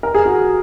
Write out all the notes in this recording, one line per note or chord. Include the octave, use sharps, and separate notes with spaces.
A#4
G#4
F#4